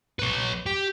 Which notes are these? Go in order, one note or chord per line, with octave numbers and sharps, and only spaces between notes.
B4 C#5
G4